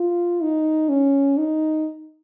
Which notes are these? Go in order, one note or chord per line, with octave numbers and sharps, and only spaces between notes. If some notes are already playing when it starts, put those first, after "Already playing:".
Already playing: F4
D#4
C#4
D#4